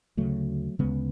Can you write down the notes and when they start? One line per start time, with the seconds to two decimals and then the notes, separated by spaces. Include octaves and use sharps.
0.17 D2 C#3 F#3 A3
0.79 D2 C#3 G#3 B3